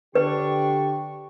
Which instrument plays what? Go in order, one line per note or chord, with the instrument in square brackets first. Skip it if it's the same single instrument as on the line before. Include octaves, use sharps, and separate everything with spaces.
[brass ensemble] D3 G4 [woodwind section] D4 C#6 [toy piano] B4